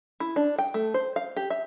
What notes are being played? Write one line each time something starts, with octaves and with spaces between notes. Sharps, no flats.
E4
D4
G5
A3
C5
F5
G4
E5